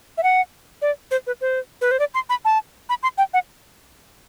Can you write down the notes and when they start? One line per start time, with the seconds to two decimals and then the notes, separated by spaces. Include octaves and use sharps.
0.18 E5
0.23 F#5
0.82 D5
1.11 C5
1.27 B4
1.41 C5
1.81 B4
1.91 C5
1.99 D5
2.14 C6
2.29 B5
2.45 A5
2.89 B5
3.03 C6
3.18 G5
3.34 F#5